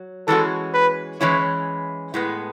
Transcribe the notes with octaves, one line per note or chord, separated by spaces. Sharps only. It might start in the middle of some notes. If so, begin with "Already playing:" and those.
Already playing: F#3
E3 G#3 C#4 F#4 A4
B4
E3 G#3 C#4 E4 C#5
A2 G#3 B3